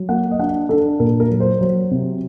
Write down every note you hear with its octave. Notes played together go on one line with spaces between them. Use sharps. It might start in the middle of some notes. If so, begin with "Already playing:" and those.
Already playing: F#3
A#3 F#5
D#5
D4 F#5
D4 A4
A#2 A#4
A#4
F#3
C5
F#3
C3